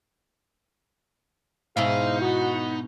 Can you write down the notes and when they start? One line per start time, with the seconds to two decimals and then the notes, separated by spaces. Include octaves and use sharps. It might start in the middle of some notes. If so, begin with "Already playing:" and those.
1.77 G#2 B2 D#4 E4 G#4 C5 F5
2.22 B3 F#4